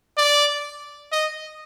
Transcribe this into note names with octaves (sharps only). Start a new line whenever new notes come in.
D5
D#5